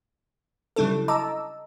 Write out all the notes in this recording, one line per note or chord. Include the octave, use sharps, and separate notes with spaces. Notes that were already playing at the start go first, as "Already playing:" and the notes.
C#3 F#3 G3 D4 E4 A4
D#5 A5 A#5 D6 E6